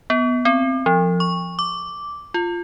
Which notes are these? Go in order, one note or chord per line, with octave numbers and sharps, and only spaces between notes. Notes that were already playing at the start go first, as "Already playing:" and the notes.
B3
C4
F3
C#6
D6
F4